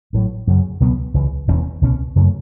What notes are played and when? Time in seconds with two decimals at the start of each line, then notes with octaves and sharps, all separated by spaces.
0.13 A1 A2 F#3
0.47 F#2 C#3 F#3
0.80 C#2 B2 F#3 B3
1.14 C#2 C#3 E3
1.47 E1 E2 E3 C#4
1.81 C#2 B2 A3 C#4
2.16 F#2 C#3 F#3 A3